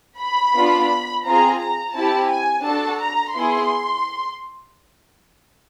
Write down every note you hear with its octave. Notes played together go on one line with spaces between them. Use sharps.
B5
B3 D4 F4
C4 F4 G#4 A#5
A#5
C4 E4 G4 A5
G#5
D4 F#4 A4 A5
A#5
B3 E4 G#4 C6